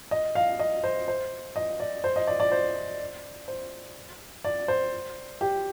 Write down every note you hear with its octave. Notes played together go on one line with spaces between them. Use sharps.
D#5
F5
D#5
C5
C5
D#5
D5
C5
D#5
D5
D5
C5
C5
D5
C5
G4